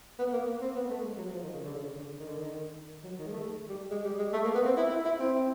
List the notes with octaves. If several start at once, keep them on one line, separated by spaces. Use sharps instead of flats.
B3
A#3
A#3
C4
B3
A3
G#3
F#3
F3
D#3
C#3
D3
C#3
D3
D#3
D3
D#3
F#3
D#3
G#3
A3
G3
G#3
G3
G#3
A3
A#3
B3
C4
E4
E4
E4
C4